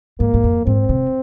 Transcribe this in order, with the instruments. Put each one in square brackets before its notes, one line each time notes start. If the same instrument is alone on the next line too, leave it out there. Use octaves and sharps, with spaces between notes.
[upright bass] G#2 [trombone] A#3
[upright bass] G#2
F2
[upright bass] G#2 [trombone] C4
[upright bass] C3